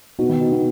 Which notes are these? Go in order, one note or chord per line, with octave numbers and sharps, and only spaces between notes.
B2 B3 D#4 F#4
D#3
B2
B3 D#4 F#4